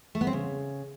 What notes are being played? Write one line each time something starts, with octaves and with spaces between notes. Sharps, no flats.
A3
B3
C4
C#3